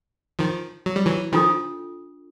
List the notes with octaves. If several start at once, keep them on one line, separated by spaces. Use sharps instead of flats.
D#3 F3
F#3
G3
E3 F#3
D#3 F3 D4 F4 A4